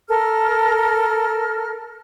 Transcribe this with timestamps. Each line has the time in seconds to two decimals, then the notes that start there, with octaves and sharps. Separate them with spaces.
0.09 A4 A#4 F6